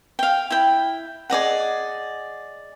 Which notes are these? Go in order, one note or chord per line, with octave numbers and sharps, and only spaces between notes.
F5 G5
E4 G5
G#4 D5 D#5 F#5